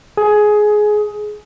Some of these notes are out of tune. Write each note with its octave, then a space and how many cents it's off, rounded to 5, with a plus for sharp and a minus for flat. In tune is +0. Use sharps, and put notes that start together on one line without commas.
G#4 +15